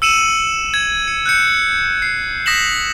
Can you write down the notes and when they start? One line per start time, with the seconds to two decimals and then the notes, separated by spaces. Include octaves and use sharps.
0.02 E6 C#7 D#7 E7 F#7
0.74 G#6
1.08 C#7
1.26 F#6 G6 C#7
2.02 C7
2.46 D#6 A#6 B6 E7 F#7